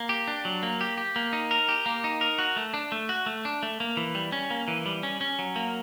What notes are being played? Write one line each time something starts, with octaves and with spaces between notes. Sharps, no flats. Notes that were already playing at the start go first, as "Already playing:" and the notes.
Already playing: A#3
G4
D4
F#3
A#3
G4
G4
A#3
D#4
A#4
G4
A#3
D#4
A#4
F#4
A3
D4
A3
F#4
A3
D4
A3
A#3
E3
G3
C#4
A#3
E3
G3
C#4
C#4
F#3
A#3